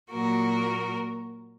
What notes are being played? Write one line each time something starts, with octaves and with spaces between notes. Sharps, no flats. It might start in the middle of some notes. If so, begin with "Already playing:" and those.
A#2 F#3 A#3 F#4 A#4